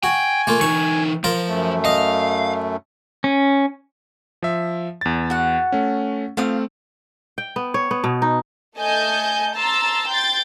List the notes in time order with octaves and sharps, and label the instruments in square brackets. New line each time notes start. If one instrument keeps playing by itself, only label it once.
[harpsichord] F#4 [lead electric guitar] G5 [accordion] G#5
[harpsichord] A3 A#3 F4
[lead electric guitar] E3 D#4 [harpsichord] C#6
[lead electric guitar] F3 [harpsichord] F4 A#4
[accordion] F#2 A3
[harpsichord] D#5 [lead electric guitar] F5
[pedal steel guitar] C#4
[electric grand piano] F3 E5
E2 A6
[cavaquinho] F#4 F#5
[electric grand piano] A3 C#4
[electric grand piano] A3 C4 [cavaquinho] F4 F5 D#6
[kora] G5
B3
C#5
B3
B2
D#4
[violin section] A3 D#5 G#5 A5 G6
A5 A#5 C6 E6 A6
G5 C6 G6 A6